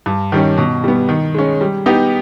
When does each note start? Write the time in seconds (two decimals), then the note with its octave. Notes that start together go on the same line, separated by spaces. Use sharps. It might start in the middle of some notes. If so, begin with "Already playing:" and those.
0.06 G2
0.32 D#3 G3 C#4
0.58 B2
0.84 G3 B3
1.09 D#3
1.35 G#3 C#4
1.61 G3
1.86 B3 D#4 G4